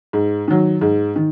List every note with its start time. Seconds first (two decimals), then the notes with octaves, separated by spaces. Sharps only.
0.13 G#2
0.48 D#3 F#3
0.81 G#2
1.16 D#3